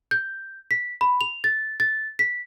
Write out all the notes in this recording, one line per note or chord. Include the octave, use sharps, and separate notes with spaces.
G6
B6
B5
F7
A6
A6
B6